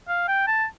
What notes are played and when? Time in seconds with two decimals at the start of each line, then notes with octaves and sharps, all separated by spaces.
0.08 F5
0.28 G5
0.47 A5